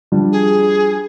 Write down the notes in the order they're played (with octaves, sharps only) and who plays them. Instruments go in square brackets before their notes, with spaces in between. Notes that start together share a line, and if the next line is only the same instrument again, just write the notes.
[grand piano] F3 G3 D4
[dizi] G#4